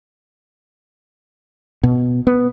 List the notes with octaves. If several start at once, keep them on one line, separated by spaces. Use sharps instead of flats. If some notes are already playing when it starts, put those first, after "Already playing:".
B2
B3